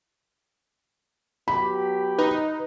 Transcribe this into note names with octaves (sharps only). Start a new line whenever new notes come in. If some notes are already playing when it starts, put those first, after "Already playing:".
F#3 B3 G4 B5
D#4 B4